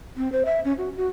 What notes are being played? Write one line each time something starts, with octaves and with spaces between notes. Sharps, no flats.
C4
C5
E5
C#4
F#4
F#4